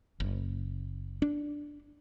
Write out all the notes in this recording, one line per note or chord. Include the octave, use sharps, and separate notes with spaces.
F#1
D4